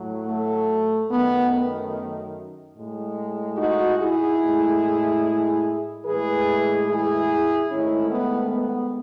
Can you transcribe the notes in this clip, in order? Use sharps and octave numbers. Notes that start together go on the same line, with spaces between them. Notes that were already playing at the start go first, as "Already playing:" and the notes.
Already playing: A2 F#3
A3
F#2 D#3 A3 B3
A2 G#3
D#4 F#4
E4 G#4
A2 G#3
A2 E3 G#3 G#4 B4
E4 G#4
G#2 D#3 A3 C#4 E4
B3
B3